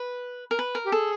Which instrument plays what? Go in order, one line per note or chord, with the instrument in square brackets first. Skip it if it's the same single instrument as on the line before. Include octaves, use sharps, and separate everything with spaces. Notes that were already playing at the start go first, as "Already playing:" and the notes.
Already playing: [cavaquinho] B4
A#4
B4
A#4
[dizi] G4
[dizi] G#4 [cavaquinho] A4